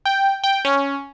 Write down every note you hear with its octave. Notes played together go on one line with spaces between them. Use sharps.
G5
G5
C#4